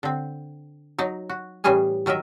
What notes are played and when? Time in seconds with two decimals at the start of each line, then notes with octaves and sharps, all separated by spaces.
0.03 D3 C4
0.98 F#3 D#4
1.29 F#4
1.64 A2 E3 G3 C#4 G#4 G#5
2.06 D#3 F#3 A#4 D#5 E5